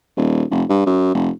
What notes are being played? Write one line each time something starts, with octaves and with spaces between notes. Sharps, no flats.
D#1
F1
G2
F#2
F1